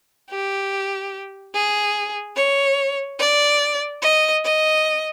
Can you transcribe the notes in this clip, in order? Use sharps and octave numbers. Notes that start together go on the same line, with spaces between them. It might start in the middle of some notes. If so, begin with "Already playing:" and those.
G4
G#4
C#5
D5
D#5
D#5